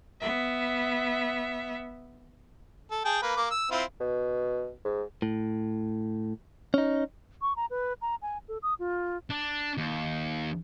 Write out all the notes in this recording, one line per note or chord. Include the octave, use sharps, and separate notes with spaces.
B3 E5
A4
G#4 G5 A5
A#3 B4
A#3 D6
E6
C4 E4 F4
B2
G#2
A2
C#4 D#4
C#6
A#5
B4
A#5
G#5
A4
D#6
F4
D4
D#2